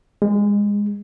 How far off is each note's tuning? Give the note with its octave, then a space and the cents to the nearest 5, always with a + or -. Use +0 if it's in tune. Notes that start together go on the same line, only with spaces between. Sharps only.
G#3 -20